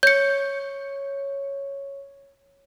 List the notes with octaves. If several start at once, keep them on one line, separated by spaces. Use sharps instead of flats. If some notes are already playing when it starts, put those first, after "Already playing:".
C#5 G6 C#7